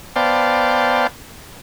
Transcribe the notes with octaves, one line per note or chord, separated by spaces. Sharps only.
B3 C5 D5 F5 G5 A5